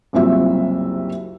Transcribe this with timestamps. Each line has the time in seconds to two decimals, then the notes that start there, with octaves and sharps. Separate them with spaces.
0.13 F#1 C2 C4 F4 F#4 E5